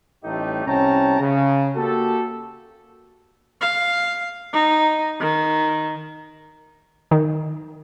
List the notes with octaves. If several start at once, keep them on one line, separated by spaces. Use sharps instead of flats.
A1 A2 G3 A3 D#4 G4
C2 C#4 G5 A5 A#5
C#3
A#3 F#4 G4 A4
F5
D#4
D#3
D#3